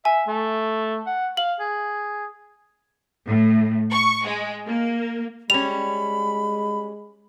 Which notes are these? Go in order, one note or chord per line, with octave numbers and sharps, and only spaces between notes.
E5 G#5
A3
F#5
F5 F#7
G#4
A2
C#6
G#3
A#3
G3 G#3 C#4 B5 F7